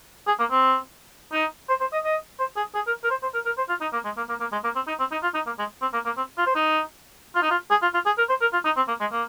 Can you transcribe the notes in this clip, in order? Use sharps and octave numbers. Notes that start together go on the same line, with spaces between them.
G#4
A#3
C4
D#4
C5
C5
D#5
D#5
C5
G#4
G#4
A#4
A#4
C5
C5
A#4
A#4
C5
F4
D#4
A#3
G#3
A#3
A#3
A#3
G#3
A#3
C4
D#4
C4
D#4
F4
D#4
A#3
G#3
C4
A#3
A#3
C4
F4
C5
D#4
F4
D#4
F4
G#4
F4
F4
G#4
A#4
C5
A#4
F4
D#4
C4
A#3
G#3
A#3